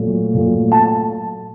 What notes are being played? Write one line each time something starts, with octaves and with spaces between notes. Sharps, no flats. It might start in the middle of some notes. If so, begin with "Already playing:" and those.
Already playing: A#2 F#3 A3
A#2 F#3 A3
A5